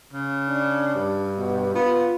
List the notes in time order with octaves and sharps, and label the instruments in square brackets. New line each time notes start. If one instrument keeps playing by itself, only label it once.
[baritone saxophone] C#3
[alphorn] D4
[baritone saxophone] G2
[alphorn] B2
[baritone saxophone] B3 [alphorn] F4